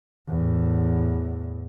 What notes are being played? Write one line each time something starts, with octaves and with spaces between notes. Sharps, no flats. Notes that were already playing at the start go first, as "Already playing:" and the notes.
E2 A2